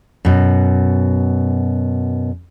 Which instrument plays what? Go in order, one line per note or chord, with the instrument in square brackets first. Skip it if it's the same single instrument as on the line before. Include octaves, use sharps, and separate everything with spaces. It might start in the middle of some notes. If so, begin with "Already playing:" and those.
[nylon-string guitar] F#2 B2